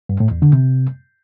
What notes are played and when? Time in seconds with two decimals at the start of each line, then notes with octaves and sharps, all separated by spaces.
0.09 G2
0.20 A2
0.31 E2
0.42 D3
0.53 C3